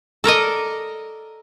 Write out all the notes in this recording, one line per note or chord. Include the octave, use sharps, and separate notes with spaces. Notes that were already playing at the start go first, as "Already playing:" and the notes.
A4 A#4 D5 D#5